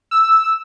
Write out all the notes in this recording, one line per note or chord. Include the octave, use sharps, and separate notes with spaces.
E6